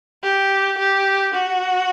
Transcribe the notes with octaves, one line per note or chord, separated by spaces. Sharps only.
G4
G4
F#4